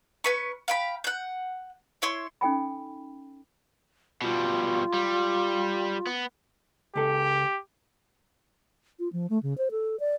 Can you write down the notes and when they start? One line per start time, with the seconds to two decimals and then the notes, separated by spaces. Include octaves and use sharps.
0.24 C#4 B4 C#6
0.68 F5 G5 B5
1.04 F#5 G6
2.02 E4 C#5 C6
2.41 C#4 D#4 A4 G5 G#5 B5
4.22 B2 G3 F4
4.93 G3
6.07 B3
6.95 C#2 G4 A4
8.99 F4
9.13 F3
9.30 A3
9.43 C#3
9.58 C5
9.71 A4
10.00 D5